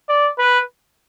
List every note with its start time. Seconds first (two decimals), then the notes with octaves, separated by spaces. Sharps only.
0.09 D5
0.39 B4